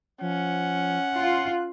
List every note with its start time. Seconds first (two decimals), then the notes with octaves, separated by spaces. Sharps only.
0.21 F3 C#4 F#5
1.16 F4 F#6